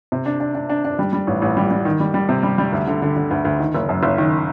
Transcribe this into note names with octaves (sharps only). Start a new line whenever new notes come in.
C3
D4
D4
D4
D4
D4
G3
G3
A1
A1
G3
G3
D#3
G3
G3
C3
G3
G3
D2
D3
D3
D3
D2
D2
D#3
F#1
F#2
F#1
D#3